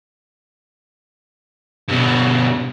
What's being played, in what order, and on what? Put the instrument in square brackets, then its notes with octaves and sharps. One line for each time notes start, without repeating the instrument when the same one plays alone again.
[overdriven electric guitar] G2 B2